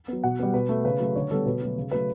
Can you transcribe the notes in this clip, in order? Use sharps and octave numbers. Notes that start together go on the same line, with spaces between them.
F#3 B3
B2 F#5
G3 B3
B2 B4
A3
C#3 B4
F#3 A3
D3 C#5
G3 B3 A4
B2 B4
F#3 A3
C#3
F#3 A3 B4